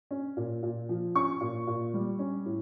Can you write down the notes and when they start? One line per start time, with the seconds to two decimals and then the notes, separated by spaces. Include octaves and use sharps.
0.11 C#4
0.37 A#2
0.63 A#2
0.89 F3
1.16 C#4 C#6
1.41 A#2
1.67 A#2
1.94 G3
2.19 C#4
2.46 A2